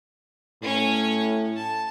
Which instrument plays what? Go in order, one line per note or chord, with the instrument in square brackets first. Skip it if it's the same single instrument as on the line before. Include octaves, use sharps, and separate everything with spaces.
[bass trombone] A2 [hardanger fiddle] C#4 C#6
[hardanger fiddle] A5